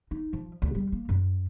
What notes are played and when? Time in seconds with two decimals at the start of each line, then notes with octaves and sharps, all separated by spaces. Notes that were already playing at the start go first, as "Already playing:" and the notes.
0.11 D#4
0.33 F3
0.62 D2
0.75 G3
0.92 A#3
1.09 F#2